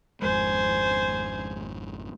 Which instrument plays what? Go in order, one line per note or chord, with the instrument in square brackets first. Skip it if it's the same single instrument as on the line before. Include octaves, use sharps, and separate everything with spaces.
[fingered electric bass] G#1 F2 G#3 [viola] C5 G#5